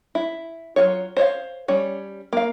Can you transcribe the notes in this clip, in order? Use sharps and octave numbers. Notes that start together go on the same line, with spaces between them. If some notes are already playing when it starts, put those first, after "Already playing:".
E4
F#3 A3 F4 C#5
C5 C#5 D#5 F5
G3 C#4 C#5
A#3 F5